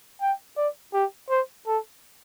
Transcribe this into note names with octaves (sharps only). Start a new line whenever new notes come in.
G5
D5
G4
C5
A4